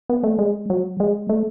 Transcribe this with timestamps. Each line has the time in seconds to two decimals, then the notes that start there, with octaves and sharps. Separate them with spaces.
0.09 B3
0.24 A3
0.39 G#3
0.70 F#3
1.00 G#3
1.29 A3